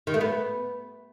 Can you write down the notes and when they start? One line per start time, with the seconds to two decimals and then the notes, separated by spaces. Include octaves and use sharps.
0.07 D#3
0.14 A3
0.21 B3